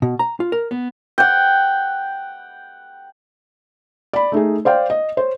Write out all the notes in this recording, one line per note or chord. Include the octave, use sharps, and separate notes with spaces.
B2
A#5
F4
A#4
B3
F#5 G5
D5 B5
A3 D#4 G#4
C5 D5 F5 G5
D#5
C5 C#5